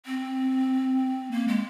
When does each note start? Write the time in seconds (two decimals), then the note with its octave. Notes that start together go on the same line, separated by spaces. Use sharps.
0.06 C4
1.32 A#3
1.48 G#3